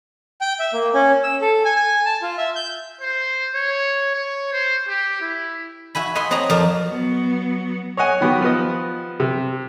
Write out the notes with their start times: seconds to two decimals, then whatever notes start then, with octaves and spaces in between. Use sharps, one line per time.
0.41 G5
0.60 E5
0.73 A#3
0.94 C#4
1.24 E6
1.41 A4
1.65 G#5
1.76 G#5
2.05 A5
2.22 F4
2.38 E5
2.56 G6
3.01 C5
3.55 C#5
4.15 C#5
4.52 C5
4.88 G4
5.21 E4
5.95 F#4 E5 G#5 B5
6.15 D#5 E5 F#5 G#5 B5 C6
6.31 C4 F#4 C#5 D#5 A#5
6.50 F2 A#4 A5
6.84 F#3 B3
7.97 C#5 D#5 F#5 G#5
8.21 D#3 B3 F#4 G4
8.41 F3 B3 B4 D#5
9.20 C3